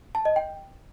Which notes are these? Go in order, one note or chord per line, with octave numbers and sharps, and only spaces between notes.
A5
D#5
G5